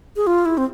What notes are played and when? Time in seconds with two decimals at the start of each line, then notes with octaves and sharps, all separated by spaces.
0.16 G#4
0.27 F4
0.45 E4
0.58 C4